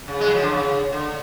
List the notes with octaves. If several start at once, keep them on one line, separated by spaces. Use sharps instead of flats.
C#3
G#3
F#3
F3
D3
C#3
D3